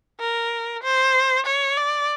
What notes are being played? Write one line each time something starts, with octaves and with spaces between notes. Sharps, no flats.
A#4
C5
C#5
D5